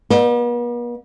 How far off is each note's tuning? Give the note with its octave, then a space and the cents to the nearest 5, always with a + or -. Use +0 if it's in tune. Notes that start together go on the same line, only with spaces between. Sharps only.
B3 -45 D5 +45